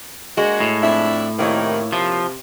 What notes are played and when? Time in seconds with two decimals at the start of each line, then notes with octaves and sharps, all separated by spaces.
0.37 G#3 A#3 D4 F#4
0.60 A2
0.83 F2 D4 E4
1.39 F2 C3 D#3 A#3 E4 C#5
1.93 C3 F3